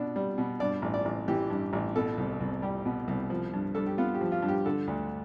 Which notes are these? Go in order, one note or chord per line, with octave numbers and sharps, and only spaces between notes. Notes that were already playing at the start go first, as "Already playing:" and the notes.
Already playing: B2 D4
G3
B2
G2 D5
A1
D5
A1
E3 G4
G2
A1
B2 A4
C2
C2
G3 G4
B2
C2
F3
G2
G2 A4
G4
B3 F4
G4
F3
F4
G2
G4
D3 A4
D2